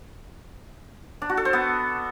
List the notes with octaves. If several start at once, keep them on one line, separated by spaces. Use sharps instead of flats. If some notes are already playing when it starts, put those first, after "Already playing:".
D4
F#4
A4
C5
B3